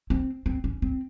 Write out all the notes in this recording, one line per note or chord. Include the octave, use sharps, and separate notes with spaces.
C4
C4
C#4
C4